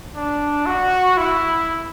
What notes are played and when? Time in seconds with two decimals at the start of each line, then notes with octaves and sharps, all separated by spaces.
0.16 D4
0.66 F#4
1.17 E4